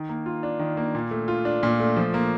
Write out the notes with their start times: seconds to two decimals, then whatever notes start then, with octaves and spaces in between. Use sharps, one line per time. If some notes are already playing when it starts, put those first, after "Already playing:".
Already playing: D#3
0.09 A#3
0.26 F4
0.43 D4
0.59 D#3
0.77 A#3
0.95 A#2
1.11 A3
1.28 F4
1.45 D4
1.63 A#2
1.80 A3
1.97 F3
2.14 A#3